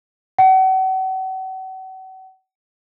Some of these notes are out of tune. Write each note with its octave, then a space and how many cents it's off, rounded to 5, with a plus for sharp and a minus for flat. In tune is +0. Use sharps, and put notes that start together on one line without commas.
F#5 +40